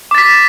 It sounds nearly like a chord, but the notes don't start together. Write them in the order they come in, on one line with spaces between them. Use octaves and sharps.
D6 A6 B6